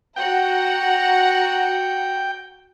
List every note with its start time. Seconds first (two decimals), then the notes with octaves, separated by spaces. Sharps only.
0.16 F#4 F#5 G5 A#5